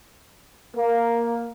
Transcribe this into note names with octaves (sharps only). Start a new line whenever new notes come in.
A#3